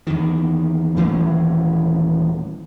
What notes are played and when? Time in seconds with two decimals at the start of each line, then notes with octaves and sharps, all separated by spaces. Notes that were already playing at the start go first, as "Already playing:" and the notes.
0.07 E2 D#3
0.97 D#1 E3 A3 C#4